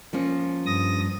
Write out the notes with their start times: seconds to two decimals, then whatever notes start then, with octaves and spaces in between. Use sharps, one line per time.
0.13 F3 A#3 C#4
0.66 G2 D#6 A#6